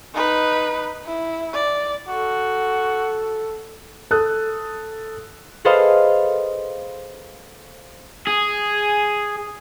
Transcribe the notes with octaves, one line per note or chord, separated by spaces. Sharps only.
D#4 B4
E4
D5
F#4 A4
A4 D#6 F#6
G#4 A4 B4 C5 D#5 F5
G#4